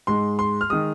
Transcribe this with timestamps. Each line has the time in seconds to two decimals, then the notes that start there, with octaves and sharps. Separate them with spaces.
0.07 G#2 G#3 C6
0.39 C6
0.61 F6
0.70 D#3 G#3 D#6